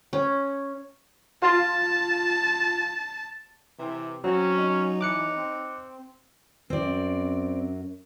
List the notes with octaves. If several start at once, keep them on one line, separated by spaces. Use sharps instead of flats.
C#4
F4 A5
C3 E3
F#3 C4 C#4
D#4
E3 D6 F#6 C#7
C4
F#2 C4 D5